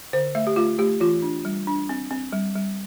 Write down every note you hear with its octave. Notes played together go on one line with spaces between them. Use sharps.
D3 C5
A3 E5
G4
A3 F4
A3 G4
E3 F4
D4
G3
D4
C4
C4
G3
G3